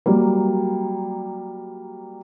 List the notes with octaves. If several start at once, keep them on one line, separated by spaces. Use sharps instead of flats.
F#3 G3 A#3